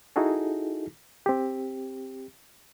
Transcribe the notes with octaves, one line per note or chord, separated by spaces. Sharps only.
D#4 E4 F#4 G#4 A4
C4 G4